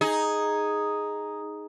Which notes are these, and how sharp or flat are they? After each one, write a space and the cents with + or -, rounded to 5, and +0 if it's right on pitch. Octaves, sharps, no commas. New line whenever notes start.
D#4 +0 G#4 +0